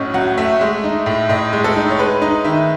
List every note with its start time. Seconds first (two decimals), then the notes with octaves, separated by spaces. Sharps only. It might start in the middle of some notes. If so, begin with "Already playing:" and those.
Already playing: A2 F#3 A3 C#4 D#5 F#5
0.14 F#3 F#5
0.37 A3 E5
0.61 G#3
0.84 D#4
1.06 A2
1.29 A2 D#5
1.53 G#3
1.64 A4
1.76 D#4
1.90 C#5
1.99 G#3 B4
2.22 D#4 D#5
2.45 D#3 E5